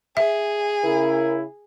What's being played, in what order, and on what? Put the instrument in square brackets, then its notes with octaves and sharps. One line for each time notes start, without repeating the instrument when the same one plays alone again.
[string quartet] G#4 [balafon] E5
[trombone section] C#3 E4 [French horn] A#4